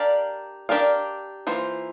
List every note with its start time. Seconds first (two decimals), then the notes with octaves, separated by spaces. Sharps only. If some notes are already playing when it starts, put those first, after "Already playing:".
Already playing: D4 G4 A#4 D5 F5
0.69 D4 G4 A#4 D5 F5
1.47 E3 A#3 F4 C5